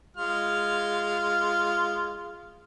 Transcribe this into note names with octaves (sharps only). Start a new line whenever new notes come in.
G#3 F4 F6